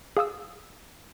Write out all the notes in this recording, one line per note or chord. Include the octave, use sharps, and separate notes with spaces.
G#4 F5 D#6 E6